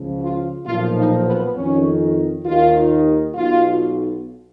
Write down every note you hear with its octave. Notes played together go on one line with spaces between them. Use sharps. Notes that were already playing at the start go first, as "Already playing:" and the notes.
Already playing: C#2 C#3 F3
F4
B1 A#2 F3 F4
D#4
B3
F2 D#3 C#4
D#2 D#3 F4
B1 B2 F4